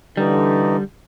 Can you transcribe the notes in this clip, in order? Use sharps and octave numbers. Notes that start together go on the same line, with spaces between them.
D3 E3 G3 D#4